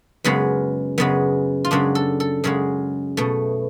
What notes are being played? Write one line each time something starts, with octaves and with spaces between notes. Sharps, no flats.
F#2 C#3 G#3 B3
F#2 C#3 G#3 B3
F4
F#2 C#3 G#3 D4
A4
A4
F#2 C#3 G#3 G#4
B2 A3